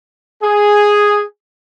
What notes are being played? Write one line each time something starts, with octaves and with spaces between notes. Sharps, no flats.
G#4